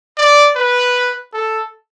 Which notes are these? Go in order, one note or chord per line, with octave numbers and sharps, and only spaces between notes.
D5
B4
A4